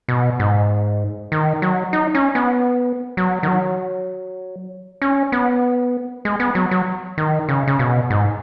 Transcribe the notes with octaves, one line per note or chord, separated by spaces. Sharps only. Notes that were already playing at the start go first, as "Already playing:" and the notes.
B2
G#2
D#3
F#3
D#4
C#4
B3
F#3
D#3
F#3
C#4
B3
G#3
B3
F#3
F#3
D#3
C#3
C#3
B2
G#2